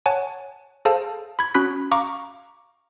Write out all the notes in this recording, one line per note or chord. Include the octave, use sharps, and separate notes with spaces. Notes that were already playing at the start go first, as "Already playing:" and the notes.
C#5 F#5 G#5 A5
G#4 A4 C5 F5 A5
B5 G#6
C#4 F#4 B5 F#6 B6
F5 A#5 C#6 D6